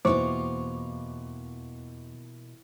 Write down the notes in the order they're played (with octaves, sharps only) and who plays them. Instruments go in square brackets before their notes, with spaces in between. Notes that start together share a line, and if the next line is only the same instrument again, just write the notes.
[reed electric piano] E2 C#6 D6 [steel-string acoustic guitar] B2 A#3 F4 [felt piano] E3 [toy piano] C5